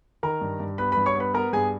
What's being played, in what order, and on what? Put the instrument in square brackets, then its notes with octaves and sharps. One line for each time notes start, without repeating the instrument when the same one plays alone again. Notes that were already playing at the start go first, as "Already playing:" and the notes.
[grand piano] D#3 A#4 A#5
G2
G2
B3 B4 B5
B4 B5
G2
C#5 C#6
B3
B4 B5
B3 A#4 A#5
G2 G#4 G#5